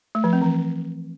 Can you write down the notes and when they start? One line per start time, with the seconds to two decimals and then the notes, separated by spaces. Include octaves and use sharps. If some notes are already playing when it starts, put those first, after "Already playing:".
0.15 A3
0.24 F3
0.33 C4
0.42 E3